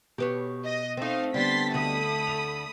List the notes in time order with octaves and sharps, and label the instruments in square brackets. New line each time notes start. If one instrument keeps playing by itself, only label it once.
[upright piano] B2 [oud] G4 B4 C#5
[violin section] D#5
[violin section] A3 D#5 F5 [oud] C4 D#4
[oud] D3 [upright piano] G3 B3 D4 [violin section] C6 A6 B6
[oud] D2 D3 D#5 [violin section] A3 B5 D#6
[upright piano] F7